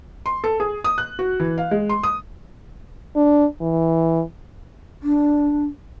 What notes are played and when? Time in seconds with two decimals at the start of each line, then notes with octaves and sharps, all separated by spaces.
0.26 C6
0.44 A4
0.60 G#4
0.84 D#6
0.98 F#6
1.19 F#4
1.40 E3
1.58 F5
1.71 G#3
1.89 C6
2.03 D#6
3.16 D4
3.61 E3
5.03 D4